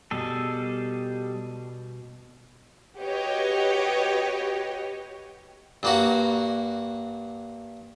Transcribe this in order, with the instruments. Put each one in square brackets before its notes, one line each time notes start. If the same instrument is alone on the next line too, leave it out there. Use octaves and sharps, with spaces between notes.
[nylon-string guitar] B2 [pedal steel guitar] G3 G#4 A4
[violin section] F#4 G4 B4 C#5 D#5
[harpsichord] G2 A#3 F#4